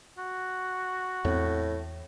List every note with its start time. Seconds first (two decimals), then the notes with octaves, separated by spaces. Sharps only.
0.18 F#4
1.25 E2 A2 A3 C4